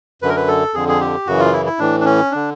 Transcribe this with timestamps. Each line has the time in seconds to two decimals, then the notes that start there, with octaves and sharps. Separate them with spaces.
0.22 F#2 D3 B4
0.29 A#4
0.36 B4
0.48 A4
0.74 F2 D3 G#4
0.88 G#4
1.01 G4
1.27 F#2 C#3 E3 F#4
1.40 F4
1.53 E4
1.66 E4
1.79 A2 E3 D4
2.00 D4
2.05 C#4
2.32 D3 D4